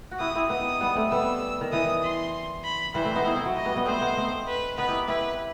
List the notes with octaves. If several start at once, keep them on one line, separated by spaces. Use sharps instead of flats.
F#4
E4 G4 D#6
C4 E4
B3 D#4 D#6
G3 B3
A3 C4
G3 B3 E6
D#3
E3 D#6
C6
B5
E3 G3 C5
A3 C4
B3 D#4
C4 E4
C4 E4
F#3
D#5
G3 B3
G3 B3
A3 C4 C5
B3 D#4
A3 C4
B4
B3 D#4 B4
E4 G4
C4 E4 B4